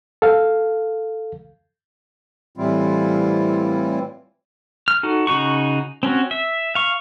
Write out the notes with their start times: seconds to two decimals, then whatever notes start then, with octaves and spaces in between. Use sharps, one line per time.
0.22 A4 F5
2.57 A2 E3 G3 C4 E4 F4
4.88 F6
5.03 D#4 F#4 A4
5.27 C#3 D#4 F#4 C#6
6.03 C4 C#4 F#4
6.31 E5
6.75 F5 C#6